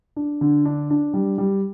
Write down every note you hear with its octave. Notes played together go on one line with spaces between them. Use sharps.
D4
D3
D4
D4
G3
G3